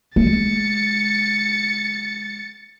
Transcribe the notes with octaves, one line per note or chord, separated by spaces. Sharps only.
G#3 A6 C#7